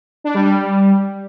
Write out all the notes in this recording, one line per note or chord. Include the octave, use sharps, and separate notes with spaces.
D4
G3
G3